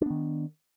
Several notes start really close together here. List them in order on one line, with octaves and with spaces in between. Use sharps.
D4 B3 D#3